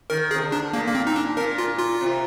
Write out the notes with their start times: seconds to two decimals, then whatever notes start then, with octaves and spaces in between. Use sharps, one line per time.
0.10 D#3 A#4
0.31 G#4
0.34 C3
0.42 D3
0.52 D4
0.73 A#2 A#3
0.88 A#3
0.95 C4
1.07 D#4
1.16 D4
1.37 A#2 A#4
1.58 F4
1.79 F4
2.01 C3